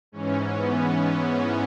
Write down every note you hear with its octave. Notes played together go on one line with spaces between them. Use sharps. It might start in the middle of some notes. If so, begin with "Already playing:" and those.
G#2 E3 C#4
B3